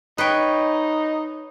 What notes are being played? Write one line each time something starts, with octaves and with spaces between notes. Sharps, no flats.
D#4 B4 C#5 G5